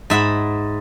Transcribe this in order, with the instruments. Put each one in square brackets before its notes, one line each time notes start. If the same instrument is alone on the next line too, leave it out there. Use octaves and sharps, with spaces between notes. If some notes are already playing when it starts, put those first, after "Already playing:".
[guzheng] G#2 E5 F#5 B5